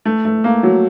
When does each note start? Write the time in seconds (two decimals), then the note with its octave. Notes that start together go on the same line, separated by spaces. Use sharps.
0.05 A3
0.25 A3
0.44 A#3
0.63 F#3